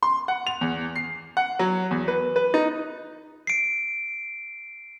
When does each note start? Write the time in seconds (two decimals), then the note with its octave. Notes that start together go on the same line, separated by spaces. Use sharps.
0.03 C6
0.28 F#5
0.47 F7
0.61 E2
0.96 C7
1.37 F#5
1.59 F#3
1.91 E2
2.08 B4
2.36 B4
2.54 D#4
3.47 C7 D7